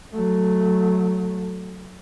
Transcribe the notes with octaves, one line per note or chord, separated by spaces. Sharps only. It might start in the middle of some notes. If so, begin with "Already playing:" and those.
F#3 A3